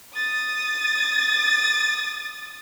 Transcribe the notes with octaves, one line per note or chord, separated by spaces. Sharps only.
D#6 A6